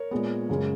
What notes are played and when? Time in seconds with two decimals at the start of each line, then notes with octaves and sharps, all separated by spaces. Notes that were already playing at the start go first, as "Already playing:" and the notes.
Already playing: A#4 C#5
0.11 A#2 G#3 B3
0.49 F#2 C#3 G#3